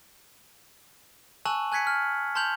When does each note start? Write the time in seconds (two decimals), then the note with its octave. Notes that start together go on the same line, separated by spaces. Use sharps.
1.46 G#5 A5 C#6 E6 F#6 F#7
1.72 G#5 F#6 G#6 B6 C#7
1.87 F6
2.35 A5 C6 F6 G6 F7 F#7